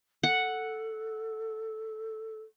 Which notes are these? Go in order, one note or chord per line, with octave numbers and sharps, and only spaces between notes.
A4 F#5